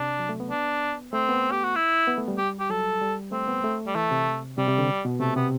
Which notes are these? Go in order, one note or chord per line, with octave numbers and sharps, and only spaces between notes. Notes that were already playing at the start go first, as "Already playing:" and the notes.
Already playing: C3 D4
F#3
A3
B3
D4
A3 C4
B3
G4
F#4
E4
B3
A3
G3
G4
G4
F#3 A4
G3
A3 C4
B3
A3
G3
E3 A3
C3
C3 G3
C3
D3
B2
C3 A3
C3 B3